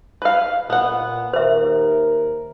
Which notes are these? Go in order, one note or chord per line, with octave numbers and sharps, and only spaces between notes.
B4 F5
A#2 B3 F#5
D#2 A#4 C5 E5